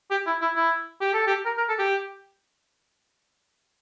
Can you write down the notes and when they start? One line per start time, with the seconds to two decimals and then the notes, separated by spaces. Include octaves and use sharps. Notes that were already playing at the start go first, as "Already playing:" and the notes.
0.11 G4
0.27 E4
0.42 E4
0.56 E4
1.01 G4
1.14 A4
1.27 G4
1.45 A#4
1.57 A#4
1.69 A4
1.79 G4